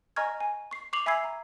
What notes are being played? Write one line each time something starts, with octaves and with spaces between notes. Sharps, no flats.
D#5 G#5 A#5 C#6 F6 G#6
G#5
C#6 C7
C#6 D6 C7 F7 F#7
E5 G#5 B5 E6 G#6 C7
A#5